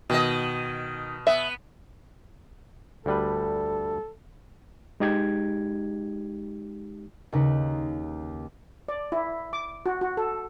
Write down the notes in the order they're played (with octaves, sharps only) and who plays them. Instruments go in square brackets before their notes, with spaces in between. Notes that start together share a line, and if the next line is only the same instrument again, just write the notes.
[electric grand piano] B2 [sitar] D#3 D#5
[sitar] B3 [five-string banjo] E5
[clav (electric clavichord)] D2 G3 B4 [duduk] A4
[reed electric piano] G#3 D#4 G4 G#6
[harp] D#2 C#3 D#4 B4
[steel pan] D5
E4
D6
F#4
F#4
A4